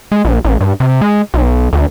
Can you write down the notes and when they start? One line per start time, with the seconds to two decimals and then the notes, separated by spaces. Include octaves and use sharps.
0.12 G#3
0.25 A#1
0.45 A1
0.61 G2
0.80 C3
1.01 G#3
1.34 B1
1.73 D2